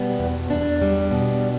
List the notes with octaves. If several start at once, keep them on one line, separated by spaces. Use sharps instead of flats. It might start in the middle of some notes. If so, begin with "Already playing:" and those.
Already playing: B2 G3 B3
E2
E2 D4
G3
B2